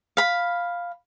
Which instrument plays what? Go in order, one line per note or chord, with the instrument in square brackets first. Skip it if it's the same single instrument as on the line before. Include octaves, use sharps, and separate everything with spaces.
[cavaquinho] F5 B5